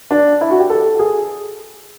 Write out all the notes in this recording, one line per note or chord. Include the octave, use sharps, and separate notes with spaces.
D4
E4
F#4
G4
A4
G#4